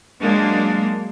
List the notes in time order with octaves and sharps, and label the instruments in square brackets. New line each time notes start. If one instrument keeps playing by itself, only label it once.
[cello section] F#3 G#3 A#3 D4